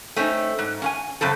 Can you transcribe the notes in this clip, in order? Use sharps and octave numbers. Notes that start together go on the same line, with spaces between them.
A3 C4 C#4 D#4
G#2
C#4 F5 G#5
F#2 C#3 C4 A4